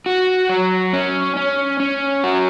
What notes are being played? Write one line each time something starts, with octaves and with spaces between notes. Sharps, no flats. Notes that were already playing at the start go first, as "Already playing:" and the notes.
F#4
F#3
C#4
C#4
C#4
F#4